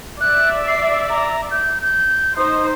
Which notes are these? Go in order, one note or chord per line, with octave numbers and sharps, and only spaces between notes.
D5 E5 F#6
C7
A#5
G6
G6
D#4 C5 D#6